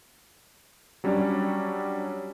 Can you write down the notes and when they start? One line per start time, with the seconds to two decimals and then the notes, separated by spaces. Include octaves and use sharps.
1.04 F#3 G3 C#4 D4 C#5 D5